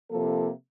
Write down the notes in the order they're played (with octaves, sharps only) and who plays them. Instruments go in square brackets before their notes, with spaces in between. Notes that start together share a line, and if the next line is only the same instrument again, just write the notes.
[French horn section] C3 F3 A#3 A4